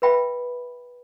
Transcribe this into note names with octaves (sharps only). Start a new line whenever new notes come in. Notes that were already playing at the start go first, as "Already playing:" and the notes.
B4 E5 G5 B5